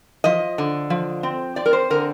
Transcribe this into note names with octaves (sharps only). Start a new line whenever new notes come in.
F3 D#5
D3
F3
C4
C4 D5
A#4
C5
D3 A#4